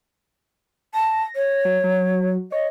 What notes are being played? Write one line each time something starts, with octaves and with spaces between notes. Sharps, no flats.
A5 A#6
C#5
F#3
F#3
C#5 D#5